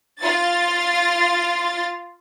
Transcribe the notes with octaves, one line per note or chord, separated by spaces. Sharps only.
F4 A6